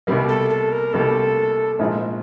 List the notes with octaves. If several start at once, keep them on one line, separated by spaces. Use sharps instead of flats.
C2 B2 G3 A#3
A4
A4
A#4
C2 B2 G3 A#3 A4
A#1 G#2 F3 G#3